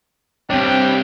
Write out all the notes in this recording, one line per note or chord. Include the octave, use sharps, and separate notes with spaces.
C2 C4 D4 G4 C#5 G5